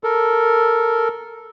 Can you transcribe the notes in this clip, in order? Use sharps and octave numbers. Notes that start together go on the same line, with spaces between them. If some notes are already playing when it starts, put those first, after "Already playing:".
A4 A#4